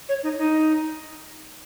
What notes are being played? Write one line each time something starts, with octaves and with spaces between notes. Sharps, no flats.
C#5
D#4
D#4